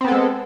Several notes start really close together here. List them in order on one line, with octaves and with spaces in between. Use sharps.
C4 B3 A4 G#3